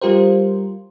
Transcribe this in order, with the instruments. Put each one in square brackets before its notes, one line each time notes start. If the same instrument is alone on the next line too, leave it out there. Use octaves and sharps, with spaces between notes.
[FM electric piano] G3 F4 G4 A#4 C5